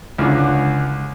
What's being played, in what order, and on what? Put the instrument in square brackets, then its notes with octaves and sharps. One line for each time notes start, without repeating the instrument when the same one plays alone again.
[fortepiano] C#2 D3